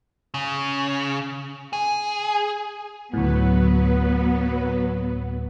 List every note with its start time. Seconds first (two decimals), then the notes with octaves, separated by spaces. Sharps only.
0.34 C#3
1.73 G#4
3.14 D2 A2 F#3 B3 B4